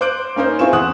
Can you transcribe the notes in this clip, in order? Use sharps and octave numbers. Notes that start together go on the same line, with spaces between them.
C5 D6 F#6 D7
A#3 C#4 D#4 C5
C4 E4 F4 G#4 C#6 E7
E2 F#5 D#6 F#6